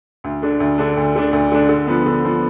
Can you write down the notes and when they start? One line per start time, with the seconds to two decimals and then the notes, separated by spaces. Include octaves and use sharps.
0.24 D2
0.42 D3 A3 D4
0.60 D2
0.78 D3 A3 D4
0.97 D2
1.15 D3 A3 D4
1.32 D2
1.52 D3 A3 D4
1.69 D3
1.87 F3 B3
2.06 D3
2.25 F3 B3